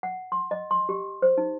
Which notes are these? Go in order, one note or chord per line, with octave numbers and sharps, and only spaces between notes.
F#5
C6
D#5
C6
G4
C5
D#4